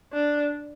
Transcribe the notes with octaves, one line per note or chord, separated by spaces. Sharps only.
D4